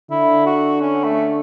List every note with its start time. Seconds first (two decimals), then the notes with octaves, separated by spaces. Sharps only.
0.11 D3 E4
0.46 F#4
0.81 C#4
1.04 A3